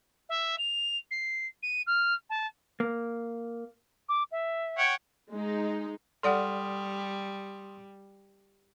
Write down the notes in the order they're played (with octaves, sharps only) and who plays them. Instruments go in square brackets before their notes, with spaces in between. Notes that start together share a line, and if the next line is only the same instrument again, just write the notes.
[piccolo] E5
F7
C7
D#7
F6
A5
[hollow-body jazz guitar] A#3
[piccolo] D6
E5
[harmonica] C#5 F#5 G5
[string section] G#3 D#4
[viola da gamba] G3 [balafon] A4 D5 F#5 [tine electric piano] C6 D#6 F6